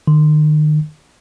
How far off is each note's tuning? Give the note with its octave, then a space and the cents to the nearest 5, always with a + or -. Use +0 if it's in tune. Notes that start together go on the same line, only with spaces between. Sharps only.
D#3 -40